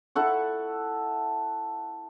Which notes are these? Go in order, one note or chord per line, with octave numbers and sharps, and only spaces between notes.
E4 A4 F#5 C#6